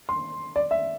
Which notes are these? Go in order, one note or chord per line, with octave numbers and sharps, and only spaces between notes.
C6
D5
E5